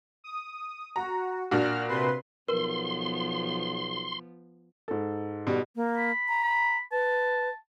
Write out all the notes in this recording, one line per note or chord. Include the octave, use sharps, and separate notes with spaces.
D#6
F#4 A#5
A#2 D4 F#4 F6
C3 B4 C6
B1 F3 B3 A#4 B4 C6
G#2 A4
B2 G3
A#3
B5
A#5
B5
B4 A5